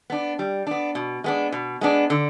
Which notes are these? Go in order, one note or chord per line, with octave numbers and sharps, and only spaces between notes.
B3 D4
G3
B3 D4
B2
G#3 B3 D4
B2
G#3 B3 D4
D3